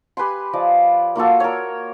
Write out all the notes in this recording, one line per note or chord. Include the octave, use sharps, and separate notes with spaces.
G4 B4 G#5 C6
F3 D5 D#5
A#3 F4 F#4 A4
A#4 C#5